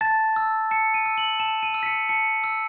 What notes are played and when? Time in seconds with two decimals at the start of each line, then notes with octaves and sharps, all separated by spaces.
0.01 A5 A6
0.36 E6
0.71 A5 C#7
0.94 D#7
1.06 E6
1.18 F#7
1.40 A5 E7
1.63 D#7
1.74 E6
1.83 B6
1.86 C#7
2.09 A5 C#7
2.44 E6